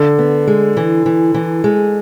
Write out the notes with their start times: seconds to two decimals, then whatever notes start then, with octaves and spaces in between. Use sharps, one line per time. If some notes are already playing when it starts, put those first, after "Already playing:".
Already playing: D3
0.19 B3
0.47 G#3
0.77 E3
1.06 E3
1.34 E3
1.64 G#3